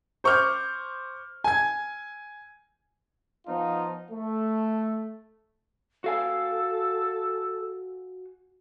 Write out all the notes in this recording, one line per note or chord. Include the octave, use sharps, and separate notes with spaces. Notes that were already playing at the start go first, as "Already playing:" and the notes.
C5 C#6 D6 F6 G6
G#5 G#6
F3 B3 D#4 F4
A3
F#4 A4 F5 G#5